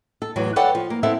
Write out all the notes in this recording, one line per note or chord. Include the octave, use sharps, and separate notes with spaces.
A4
E2 A2 E3 F#3
A4 B4 C#5 D5 F#5 G5
F3
A#3
B3 C4 E4 A4 E5